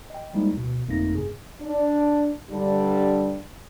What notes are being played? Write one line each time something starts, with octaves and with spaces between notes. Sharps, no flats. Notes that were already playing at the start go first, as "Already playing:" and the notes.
D#5 G5
F3 G3 G#3 A#3 D#4 E4
D2 B2
G1 F2 A3 A#3 D#4 A#6
G2 C3 G#4
D4
G2 D3 G3 D4